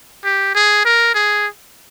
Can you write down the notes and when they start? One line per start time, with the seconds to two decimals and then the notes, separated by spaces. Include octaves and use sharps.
0.25 G4
0.55 G#4
0.85 A#4
1.15 G#4